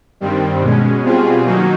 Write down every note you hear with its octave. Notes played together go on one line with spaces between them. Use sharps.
G2 D#3 G3 C4
B2 G#3 C#4
B2 G3 C4 F4 G#4
D#3 F#3 A#3 D#4 F#4